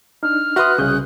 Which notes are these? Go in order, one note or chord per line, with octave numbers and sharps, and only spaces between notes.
D4 D#4 F6
F#4 B4 E5 C6 D#6 F#6
C2 C#3 D#6 G6